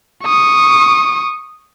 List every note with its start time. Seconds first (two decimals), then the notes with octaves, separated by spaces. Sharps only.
0.24 C#6 D#6